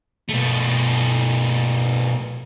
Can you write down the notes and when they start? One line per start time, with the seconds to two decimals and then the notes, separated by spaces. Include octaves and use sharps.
0.29 B2 A3